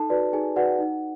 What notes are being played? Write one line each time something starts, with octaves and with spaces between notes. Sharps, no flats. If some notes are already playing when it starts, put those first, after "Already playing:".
Already playing: D#4 A4 A5
F#4 B4 D5
D#4 G#4 G#5
F#4 B4 D5 F#5
D#4